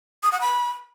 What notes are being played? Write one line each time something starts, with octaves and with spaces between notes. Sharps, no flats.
D#6
F#5
B5